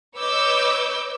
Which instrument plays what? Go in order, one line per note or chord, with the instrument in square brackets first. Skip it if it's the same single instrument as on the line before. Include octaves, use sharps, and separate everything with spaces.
[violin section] B4 C#5 D#5 D6 E6 G6